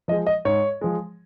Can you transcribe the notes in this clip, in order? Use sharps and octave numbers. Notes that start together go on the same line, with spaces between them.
F3 G#3 D#5
D#5
G#2 C#5
F3 G#3